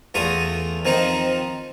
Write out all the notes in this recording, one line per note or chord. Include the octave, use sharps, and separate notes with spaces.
E2 A3 F4 E5 D#6
D#3 F3 C4 D#4